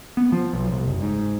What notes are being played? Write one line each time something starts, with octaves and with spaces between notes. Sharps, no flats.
B3
F3
B1
C2
F#1
G#2